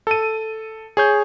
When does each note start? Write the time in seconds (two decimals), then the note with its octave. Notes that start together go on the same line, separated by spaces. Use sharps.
0.07 A4 D#7
0.97 G#4 C#5 G6